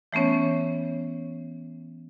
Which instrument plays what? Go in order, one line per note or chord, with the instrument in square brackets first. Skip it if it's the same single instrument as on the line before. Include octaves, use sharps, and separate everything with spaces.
[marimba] E3 A3 B3 C#4 C#5